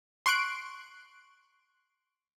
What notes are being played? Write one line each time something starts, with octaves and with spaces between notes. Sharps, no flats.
C6 C#6 F#6 D7